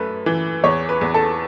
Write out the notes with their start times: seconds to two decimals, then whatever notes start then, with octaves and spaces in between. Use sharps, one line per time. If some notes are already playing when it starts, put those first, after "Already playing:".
Already playing: F#2 A3 B4
0.26 E3
0.64 E2 C#5
0.89 B4
1.01 E2
1.14 A4